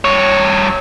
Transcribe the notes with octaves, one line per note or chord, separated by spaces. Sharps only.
G2 C#5